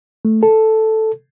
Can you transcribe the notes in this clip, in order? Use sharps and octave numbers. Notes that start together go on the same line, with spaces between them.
A3
A4